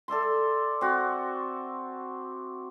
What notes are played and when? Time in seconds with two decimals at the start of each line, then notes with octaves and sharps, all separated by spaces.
0.08 A4 D5 E5 C6
0.81 C4 F#4